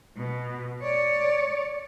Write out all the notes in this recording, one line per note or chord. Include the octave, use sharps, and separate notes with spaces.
B2
C#5 D5